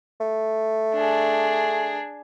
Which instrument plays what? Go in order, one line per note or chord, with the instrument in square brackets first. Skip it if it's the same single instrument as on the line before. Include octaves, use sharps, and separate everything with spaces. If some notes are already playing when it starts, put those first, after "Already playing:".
[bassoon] A3
[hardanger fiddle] D4 G#4